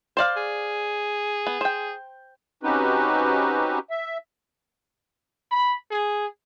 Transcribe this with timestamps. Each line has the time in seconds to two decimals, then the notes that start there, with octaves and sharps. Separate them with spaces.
0.17 C5 D5 F5
0.37 G#4
1.47 B3
1.61 C5 G5
2.63 C4 C#4 D#4 F#4 G4 B4
3.90 E5
5.51 B5
5.91 G#4